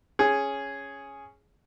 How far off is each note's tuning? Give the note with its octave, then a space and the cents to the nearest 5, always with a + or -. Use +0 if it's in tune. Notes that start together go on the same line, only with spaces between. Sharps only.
C#4 +0 G#4 +0